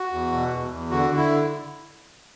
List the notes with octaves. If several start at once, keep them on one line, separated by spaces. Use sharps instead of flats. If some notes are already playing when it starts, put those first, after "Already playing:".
Already playing: F#4
E2
B2
E2
E2
D3 F#4
D3
E4